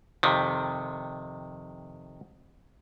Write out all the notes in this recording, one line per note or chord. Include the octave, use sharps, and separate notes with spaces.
F2 C3 D#3